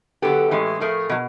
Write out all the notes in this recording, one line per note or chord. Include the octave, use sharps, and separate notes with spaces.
D3 F#3 B3 G4 A4
A2 E3 G#3 C#4
A2 F3 A3 G#4 A#4
B2 F#3